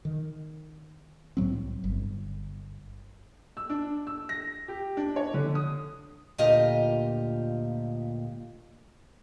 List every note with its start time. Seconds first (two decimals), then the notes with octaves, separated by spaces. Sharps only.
0.05 D#3
1.37 C2 A2 F#3 C4
1.84 G1
3.57 E6
3.70 D4
4.07 E6
4.29 A#6
4.68 G4
4.97 D4
5.16 C#5
5.34 D3
5.55 D#6
6.38 D2 A#2 F4 G4 D#5 F5